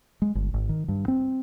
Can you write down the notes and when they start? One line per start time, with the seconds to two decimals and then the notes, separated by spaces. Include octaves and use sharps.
0.22 G#3
0.35 G1
0.53 G#1
0.69 D#3
0.88 G2
1.08 C4